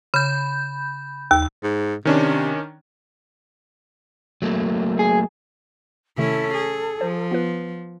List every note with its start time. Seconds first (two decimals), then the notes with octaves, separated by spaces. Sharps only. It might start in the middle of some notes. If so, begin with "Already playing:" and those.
0.14 C#3 B5 G6
1.31 D#2 E6
1.63 G#2
2.05 C3 D#3 C#4 D4
4.42 F#3 A3 A#3
4.99 G#4
6.18 C3 D#3 A3 C#4 E4 A4
6.54 G#4
7.01 F3 C5
7.31 B3 F4 B4